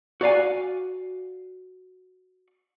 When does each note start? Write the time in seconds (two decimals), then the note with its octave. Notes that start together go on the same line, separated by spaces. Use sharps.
0.21 F#4 D5 F5 G#5